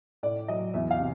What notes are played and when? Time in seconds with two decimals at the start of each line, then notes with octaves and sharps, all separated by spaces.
0.23 A2 D5
0.48 F#3 D#5
0.74 E2 E5
0.91 F5
0.99 C3